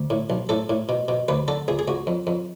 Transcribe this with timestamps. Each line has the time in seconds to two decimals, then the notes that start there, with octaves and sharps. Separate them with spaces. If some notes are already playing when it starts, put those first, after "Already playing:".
Already playing: D2
0.10 A2
0.30 B1
0.49 A2 A4
0.70 A2
0.89 B2
1.08 B2
1.28 D2 B4
1.48 D3 A4
1.68 C#2 G#4
1.79 G#4
1.88 C#2 F#4
2.07 F2
2.27 F2